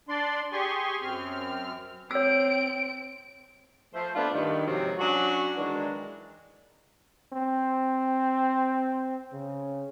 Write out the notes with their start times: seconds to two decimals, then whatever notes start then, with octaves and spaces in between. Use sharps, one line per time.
0.09 D4 D5 C6
0.52 G4 G#4 G#5 C6 C#6
1.02 F#2 C4 F6
2.11 C4 C#5 E6 D7
3.93 F3 A3 C5
4.15 A3 B3 C4 D4 F4
4.33 G2 D#3
4.67 G#2 C3 F3 F#3 C4 F4
4.98 F#3 C#4 D4 F#4
5.56 D#3 E3 G#3 D4
7.33 C4
9.33 C#3